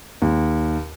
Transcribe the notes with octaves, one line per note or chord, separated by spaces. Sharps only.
D#2